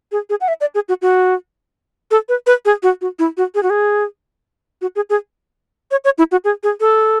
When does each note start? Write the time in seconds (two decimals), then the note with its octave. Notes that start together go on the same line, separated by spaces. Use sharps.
0.12 G#4
0.30 G#4
0.41 F#5
0.48 E5
0.61 D5
0.75 G#4
0.89 F#4
1.02 F#4
2.11 A4
2.29 B4
2.47 B4
2.65 G#4
2.83 F#4
3.01 F#4
3.19 E4
3.37 F#4
3.55 G#4
3.63 F#4
3.70 G#4
4.81 F#4
4.96 G#4
5.10 G#4
5.91 C#5
6.05 C#5
6.18 E4
6.32 F#4
6.44 G#4
6.63 G#4
6.80 A4